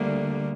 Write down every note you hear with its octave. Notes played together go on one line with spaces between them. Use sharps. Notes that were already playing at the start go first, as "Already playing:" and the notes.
Already playing: D2 D3 G3 A#3